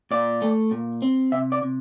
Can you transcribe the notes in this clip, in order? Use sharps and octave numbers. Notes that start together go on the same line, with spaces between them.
A#2 D5
A3
A#2
C4
C3 E5
D5
C3